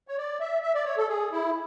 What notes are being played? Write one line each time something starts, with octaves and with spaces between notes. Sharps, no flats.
C#5
D5
E5
E5
D5
C#5
A4
G#4
E4